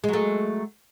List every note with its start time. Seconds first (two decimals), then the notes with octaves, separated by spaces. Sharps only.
0.04 G#3
0.08 F#3
0.13 A3